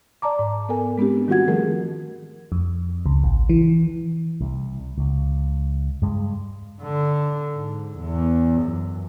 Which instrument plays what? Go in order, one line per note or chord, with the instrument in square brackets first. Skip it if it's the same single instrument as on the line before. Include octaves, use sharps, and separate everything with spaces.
[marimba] D5 A5 A#5 D6
G#2
B3 A4 A#4 G#5
G#3 B3 C4 D4 G4
D#3 G3 F4 F#4 F#5 G#6
D#3 F3 A3 G#4 A#4
[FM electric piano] F2
C#2
A1
E3
[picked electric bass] C2
C#2
G2 G#3
[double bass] D3
G#2
E2
F#2